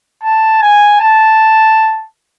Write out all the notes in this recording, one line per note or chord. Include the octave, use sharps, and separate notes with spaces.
A5
G#5
A5